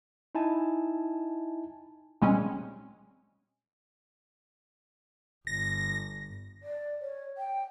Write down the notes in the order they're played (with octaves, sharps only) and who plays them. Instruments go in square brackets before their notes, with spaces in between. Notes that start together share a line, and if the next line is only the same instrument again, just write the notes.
[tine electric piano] D#4 E4 G#5 A5
[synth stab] A#2 G3 G#3 C4 C#4
[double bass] G1 [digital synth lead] A#6
[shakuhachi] D5
C#5
G5